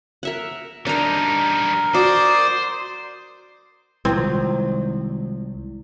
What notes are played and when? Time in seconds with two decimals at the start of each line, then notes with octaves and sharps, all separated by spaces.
0.23 A#4 E5 F#5
0.87 G3 D4 D#4 A#4 A#5
1.94 F#4 C5 D5 D6 D#6
4.05 C2 D#3 F3 F#3 G#3 C4 E4